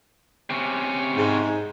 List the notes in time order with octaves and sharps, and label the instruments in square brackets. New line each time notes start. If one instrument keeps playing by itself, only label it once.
[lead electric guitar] C3 C#4
[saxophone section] G#2